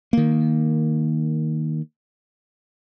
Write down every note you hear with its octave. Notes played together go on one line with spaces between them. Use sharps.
D#3 A#3